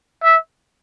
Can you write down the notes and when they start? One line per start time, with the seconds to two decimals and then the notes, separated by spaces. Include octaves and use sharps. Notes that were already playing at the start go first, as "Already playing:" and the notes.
0.23 E5